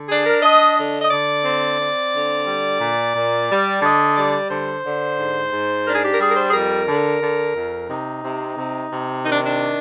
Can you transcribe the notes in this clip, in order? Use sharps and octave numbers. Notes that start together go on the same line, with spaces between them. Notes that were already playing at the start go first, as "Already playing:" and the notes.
Already playing: D3
D4 G#4
A#4
D4 D#5
D3 D#5
D#5
D3 D5
C4
C4
D3
G3
A#2
A#2
G3
D3 D#5
G3 D5
D3 C5
D3
G#2
G#2
D4 A#4
G#4
G4
A#4
G3 G#4
A#4
C5
G#4
F2 A#4
D3
D3
F2
C3 D#4
C3
C3
C3
D#3 D#4
D4
D4